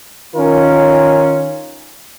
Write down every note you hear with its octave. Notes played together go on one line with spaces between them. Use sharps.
D#3 C#4 F4 A#4